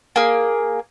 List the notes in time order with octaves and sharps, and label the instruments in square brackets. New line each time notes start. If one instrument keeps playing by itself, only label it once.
[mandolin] A#3 G#4